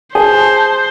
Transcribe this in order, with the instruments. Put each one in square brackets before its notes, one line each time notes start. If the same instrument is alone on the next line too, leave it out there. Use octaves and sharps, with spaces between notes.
[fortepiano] G#4 [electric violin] C5 [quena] A5